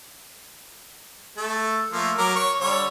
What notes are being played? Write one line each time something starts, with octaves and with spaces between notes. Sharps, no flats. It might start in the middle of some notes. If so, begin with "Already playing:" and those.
A3 A4
F3 A3 A#3
F#3 A#4 D6
C#5 C#6
D3 G3 C#5